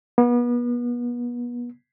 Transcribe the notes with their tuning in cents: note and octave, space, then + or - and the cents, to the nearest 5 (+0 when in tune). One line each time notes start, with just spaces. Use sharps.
B3 -35